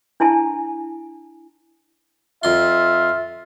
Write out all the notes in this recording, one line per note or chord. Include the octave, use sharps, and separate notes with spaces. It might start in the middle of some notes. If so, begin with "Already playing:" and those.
D4 E4 G#5 A5
F2 F4 E5 C6